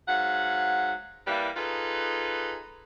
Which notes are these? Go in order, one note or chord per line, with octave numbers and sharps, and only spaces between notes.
G#2 F#3 F5 F#5
E3 G3 A#3 E4 B4 D5
D#4 F4 G#4 A4 B4